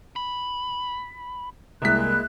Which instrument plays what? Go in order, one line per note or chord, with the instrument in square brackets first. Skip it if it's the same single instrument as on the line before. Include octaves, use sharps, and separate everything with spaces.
[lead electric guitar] B5
[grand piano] C2 B6 [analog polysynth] G#3 A#3 E4 [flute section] F#6